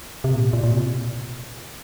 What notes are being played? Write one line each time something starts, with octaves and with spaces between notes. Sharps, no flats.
C3
A#2
A#2
A#2
C3